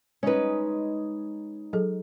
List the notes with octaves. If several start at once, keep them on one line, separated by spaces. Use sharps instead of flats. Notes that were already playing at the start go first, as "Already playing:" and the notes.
G#3 C#4 D#4 B4
F#3 G#4 A4